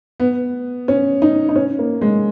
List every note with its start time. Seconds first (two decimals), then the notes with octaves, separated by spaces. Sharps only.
0.20 B3
0.88 C#4
1.22 D#4
1.49 D#4
1.56 C#4
1.79 A#3
2.01 G#3